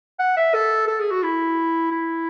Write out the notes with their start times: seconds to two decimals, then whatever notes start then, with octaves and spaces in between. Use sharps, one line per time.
0.19 F#5
0.37 E5
0.54 A4
0.88 A4
1.00 G#4
1.11 F#4
1.23 E4
1.91 E4